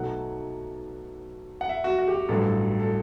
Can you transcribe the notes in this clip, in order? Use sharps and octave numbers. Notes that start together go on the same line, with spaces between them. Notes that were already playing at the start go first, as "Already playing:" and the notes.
Already playing: B1 B2 F#3 A3 D#4 F#5
F#5
E5
F#4
F#4
G4
F#4
A1 G2 F#3 A4
A4